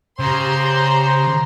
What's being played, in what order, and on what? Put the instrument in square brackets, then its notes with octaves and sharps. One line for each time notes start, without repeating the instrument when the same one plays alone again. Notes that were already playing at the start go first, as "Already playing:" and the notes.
[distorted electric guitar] C#3 [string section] G4 A#5 C6 [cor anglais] C5